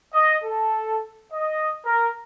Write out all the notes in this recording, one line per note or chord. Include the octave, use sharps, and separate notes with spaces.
D#5
A4
D#5
A#4